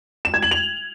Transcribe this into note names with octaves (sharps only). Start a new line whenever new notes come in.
E7
G#6
F#7
F7